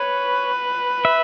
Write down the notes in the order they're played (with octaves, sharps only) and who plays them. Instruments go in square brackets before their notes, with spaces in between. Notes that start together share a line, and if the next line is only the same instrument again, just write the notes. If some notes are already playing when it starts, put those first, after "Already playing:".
Already playing: [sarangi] B4 [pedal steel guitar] C#5
[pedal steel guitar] E5